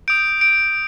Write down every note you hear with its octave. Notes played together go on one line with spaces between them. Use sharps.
D#6 G6 D7
D7